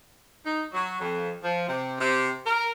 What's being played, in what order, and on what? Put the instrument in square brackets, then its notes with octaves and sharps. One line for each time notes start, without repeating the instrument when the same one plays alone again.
[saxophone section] D#4
F#3
F2
F3
C3
C3
A#4